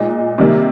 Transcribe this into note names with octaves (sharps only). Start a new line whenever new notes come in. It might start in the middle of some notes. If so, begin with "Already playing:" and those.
Already playing: A#2 G#3 D#4
C3 D#3 G3 A#3